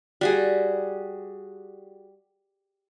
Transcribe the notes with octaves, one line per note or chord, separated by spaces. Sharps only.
G3 F#4 G#4